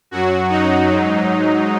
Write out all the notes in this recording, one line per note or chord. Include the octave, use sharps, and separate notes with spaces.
F#2 F#3 F#4
D#4
G#2 F#3